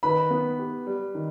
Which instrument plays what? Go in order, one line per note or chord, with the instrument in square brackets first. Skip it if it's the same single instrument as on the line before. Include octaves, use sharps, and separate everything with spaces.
[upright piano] D#3 [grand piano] B4 B5
[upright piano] B3
G4
G3
D#3